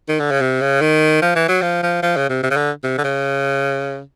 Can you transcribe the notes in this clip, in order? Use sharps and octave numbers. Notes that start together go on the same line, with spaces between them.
D#3
D3
C#3
C3
C#3
D#3
F3
E3
F#3
F3
F3
F3
C#3
C3
C3
C#3
D3
C3
D3
C#3